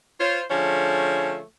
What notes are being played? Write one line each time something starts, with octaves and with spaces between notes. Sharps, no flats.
F4 C5 C#5
D3 F3 A3 C#4 G#4 C#5